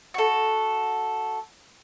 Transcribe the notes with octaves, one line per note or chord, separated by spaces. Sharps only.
F#4 A4